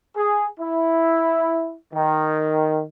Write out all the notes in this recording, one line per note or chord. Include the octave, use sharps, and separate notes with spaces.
G#4
E4
D#3